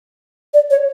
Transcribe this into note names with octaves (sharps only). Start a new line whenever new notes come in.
D5
C#5